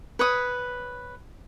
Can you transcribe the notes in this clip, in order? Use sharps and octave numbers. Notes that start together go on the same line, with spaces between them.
B4 C#5 D#6